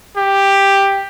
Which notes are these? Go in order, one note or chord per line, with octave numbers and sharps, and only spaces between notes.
G4